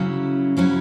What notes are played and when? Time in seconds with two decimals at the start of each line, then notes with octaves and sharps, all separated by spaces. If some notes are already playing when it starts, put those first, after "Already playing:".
Already playing: C#3 F#3 C#4 E4
0.57 C#3 F#3 C#4 E4